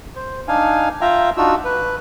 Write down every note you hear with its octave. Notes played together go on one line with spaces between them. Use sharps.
C5
D4 D#4 F5 G#5
F4 E5 F5 G5 A#5
D4 D#4 F4 F#4 E6
B4